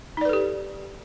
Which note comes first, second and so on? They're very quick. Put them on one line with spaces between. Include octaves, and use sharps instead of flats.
D#4 D5 B4 A4 G4